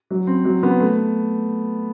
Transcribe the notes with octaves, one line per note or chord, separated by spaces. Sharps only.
F#3
C4
F#3
B3
A3